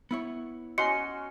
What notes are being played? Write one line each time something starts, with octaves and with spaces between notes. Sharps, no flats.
B3 E4 C#5
C#4 F#4 D#5 C6 C#7